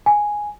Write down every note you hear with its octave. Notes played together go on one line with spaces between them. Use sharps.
G#5